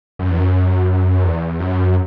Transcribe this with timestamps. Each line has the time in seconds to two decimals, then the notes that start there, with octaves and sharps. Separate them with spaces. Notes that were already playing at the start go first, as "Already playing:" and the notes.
0.19 F#2
0.30 E2
0.37 F#2
1.24 E2
1.60 F#2